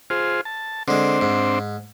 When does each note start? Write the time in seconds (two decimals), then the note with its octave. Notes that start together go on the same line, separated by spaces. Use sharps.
0.10 F4 G#4 C5
0.45 A5
0.88 D3 G#3 C4 D4 C5
1.21 G#2